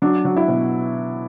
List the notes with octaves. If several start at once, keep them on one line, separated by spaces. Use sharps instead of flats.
F#3 D4
F#3
E4
B2